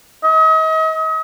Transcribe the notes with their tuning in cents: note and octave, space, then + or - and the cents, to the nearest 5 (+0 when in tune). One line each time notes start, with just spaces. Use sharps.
D#5 +40